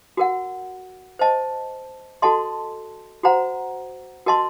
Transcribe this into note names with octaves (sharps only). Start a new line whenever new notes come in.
F#4 A#4 F#5
C5 D#5 A5
F#4 A4 D#5 A5 C6
F#4 C5 F#5 A#5
F#4 A#4 D#5 A5 C6